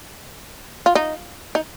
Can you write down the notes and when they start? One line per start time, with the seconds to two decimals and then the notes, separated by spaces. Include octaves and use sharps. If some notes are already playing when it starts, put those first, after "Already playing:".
0.86 F4
0.95 D#4
1.55 D#4